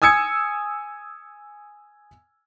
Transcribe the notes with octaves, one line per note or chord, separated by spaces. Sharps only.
G#5 D#6 E6 G#6 C#7